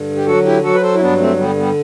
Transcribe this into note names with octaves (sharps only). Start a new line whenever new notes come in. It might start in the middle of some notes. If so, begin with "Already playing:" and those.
Already playing: G2 D3
G4
F#3 F#4 A4
E4 G4
F#3 F#4 A4
B4
A4 C5
E4
G2 B3 D4
A3 C4
D3 G3 B3
G3 B3